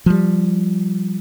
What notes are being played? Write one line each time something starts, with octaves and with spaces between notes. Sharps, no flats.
F3 G3